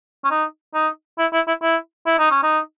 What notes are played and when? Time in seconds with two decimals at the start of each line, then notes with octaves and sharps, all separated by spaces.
0.25 C#4
0.31 D#4
0.74 D#4
1.19 E4
1.33 E4
1.48 E4
1.63 E4
2.07 E4
2.19 D#4
2.31 C#4
2.43 D#4